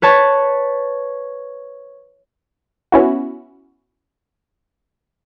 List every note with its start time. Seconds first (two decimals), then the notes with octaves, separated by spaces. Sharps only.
0.02 B4 C#5 A5
2.92 B3 C#4 E4 F#4